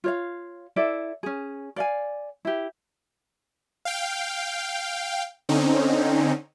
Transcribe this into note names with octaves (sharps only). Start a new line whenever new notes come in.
F4 C#5 F5
E4 A4 D5 E5
C#4 G#4
D5 F5 G#5
E4 G4
F5 G5
D3 C4 C#4 D#4